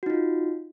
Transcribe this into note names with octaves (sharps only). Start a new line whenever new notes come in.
D#4 F4 F#4